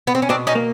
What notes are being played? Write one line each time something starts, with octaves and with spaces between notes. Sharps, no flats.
B3
C4
C#4
B2 C4 D4
C#4 D#4
A#3